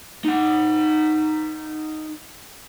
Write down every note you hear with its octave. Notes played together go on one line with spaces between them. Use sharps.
D#4 F#5